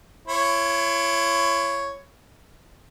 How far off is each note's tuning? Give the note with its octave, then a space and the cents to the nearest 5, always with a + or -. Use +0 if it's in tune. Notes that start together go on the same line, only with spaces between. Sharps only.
E4 +40 C#5 +0